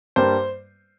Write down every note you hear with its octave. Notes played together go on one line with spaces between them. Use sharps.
G2 G3 A#3 C5